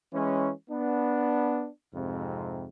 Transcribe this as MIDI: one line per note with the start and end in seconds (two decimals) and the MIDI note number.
0.13 0.50 52
0.13 0.50 56
0.13 0.50 61
0.70 1.68 59
0.70 1.68 62
1.94 2.69 41
1.94 2.69 44
1.94 2.69 48